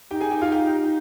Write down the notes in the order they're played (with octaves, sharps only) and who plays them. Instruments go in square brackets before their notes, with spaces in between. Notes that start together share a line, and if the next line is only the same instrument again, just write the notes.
[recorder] D#4 [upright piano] G4 G5
[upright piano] G#4 G#5
G4 G5
F4 F5
G4 G5